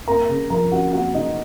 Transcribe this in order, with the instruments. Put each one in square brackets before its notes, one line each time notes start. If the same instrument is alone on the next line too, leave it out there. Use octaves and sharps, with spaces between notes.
[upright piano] A#3 A#4 A#5
C#3
F3 A#4 A#5
C#4 F#4 F#5
A#3 F#4 F#5
C#3 D#4 D#5